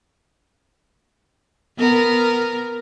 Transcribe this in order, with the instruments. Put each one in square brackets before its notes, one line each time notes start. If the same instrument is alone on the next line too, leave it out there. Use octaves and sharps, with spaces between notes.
[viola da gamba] B3 A#4